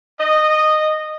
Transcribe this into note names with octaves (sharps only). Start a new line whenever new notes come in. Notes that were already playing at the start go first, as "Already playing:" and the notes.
D#5